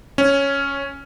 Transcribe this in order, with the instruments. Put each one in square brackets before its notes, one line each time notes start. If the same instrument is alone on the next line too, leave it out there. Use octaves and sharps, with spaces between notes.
[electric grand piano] C#4